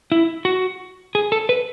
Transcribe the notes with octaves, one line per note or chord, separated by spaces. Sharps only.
E4
F#4
G#4
A4
B4